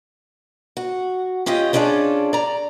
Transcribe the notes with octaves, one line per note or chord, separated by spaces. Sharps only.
F#4
C#4 F4 G4 D#5
B3 C#4 D4 F4 G#4 A4
D5 A#5